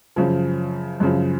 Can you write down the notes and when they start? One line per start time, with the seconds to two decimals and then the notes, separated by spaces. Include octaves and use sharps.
0.16 F#2 C#3 F3
1.00 F#2 C#3 F3